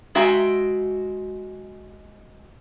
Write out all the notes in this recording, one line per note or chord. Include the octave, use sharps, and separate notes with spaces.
G#3 F#4 E5 G5 A#5